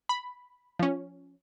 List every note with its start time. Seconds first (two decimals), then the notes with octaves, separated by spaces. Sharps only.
0.09 B5
0.79 F3 C#4